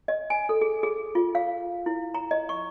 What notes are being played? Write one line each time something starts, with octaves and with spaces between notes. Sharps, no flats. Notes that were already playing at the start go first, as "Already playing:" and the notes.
D#5
G#5
A4
G#4
G#4
F4
F5
E4
A#5
D#5
C#6